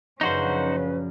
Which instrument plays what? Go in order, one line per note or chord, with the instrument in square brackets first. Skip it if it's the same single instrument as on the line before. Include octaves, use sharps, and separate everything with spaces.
[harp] A#1 F#2 [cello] C#3 C#4 [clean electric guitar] D#4 F#4 C5 [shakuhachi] B4